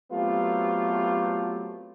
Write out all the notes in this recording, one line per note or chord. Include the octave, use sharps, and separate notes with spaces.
F#3 A3 B3 C4 F4 G4